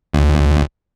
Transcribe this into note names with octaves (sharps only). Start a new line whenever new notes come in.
D2